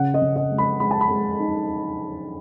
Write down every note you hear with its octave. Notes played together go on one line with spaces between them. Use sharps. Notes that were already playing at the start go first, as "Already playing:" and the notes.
Already playing: C#3 F#5
D#5
C#3
D#5
G#3
B5
G#3 B5
A5
B5
G#3
D#4